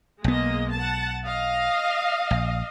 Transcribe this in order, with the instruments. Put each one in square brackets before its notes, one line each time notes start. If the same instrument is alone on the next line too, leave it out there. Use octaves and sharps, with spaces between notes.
[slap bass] B1 B3 [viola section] G#3 A#3 D#5
[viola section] F#5 A5
D#5 F5
[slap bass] A#1